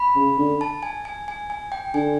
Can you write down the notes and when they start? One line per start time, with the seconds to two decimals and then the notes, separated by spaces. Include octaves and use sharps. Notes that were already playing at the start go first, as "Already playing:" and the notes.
Already playing: B5
0.16 C#3
0.38 D3
0.61 A5
0.83 G#5
1.05 G#5
1.28 G#5
1.50 G#5
1.72 G5
1.94 D3 G#5